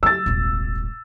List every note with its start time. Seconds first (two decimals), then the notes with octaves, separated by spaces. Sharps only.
0.03 F#3 E6 A6
0.26 D#1 G#1